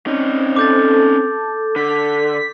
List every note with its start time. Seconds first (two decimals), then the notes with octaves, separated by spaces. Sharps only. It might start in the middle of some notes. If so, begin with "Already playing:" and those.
0.07 C4 C#4 D#4
0.56 A4 D6 G6 A6
1.76 D3 A4 B6